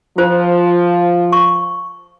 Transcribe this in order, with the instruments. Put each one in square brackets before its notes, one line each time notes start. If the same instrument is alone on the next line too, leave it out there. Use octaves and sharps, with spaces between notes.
[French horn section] F3 [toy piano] F4 C5
[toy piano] C#6